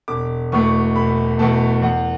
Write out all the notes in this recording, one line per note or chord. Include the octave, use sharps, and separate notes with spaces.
E1 D6
E2 B2 A3 C#6
E1 B5
E2 B2 A3 A5
E2 F#5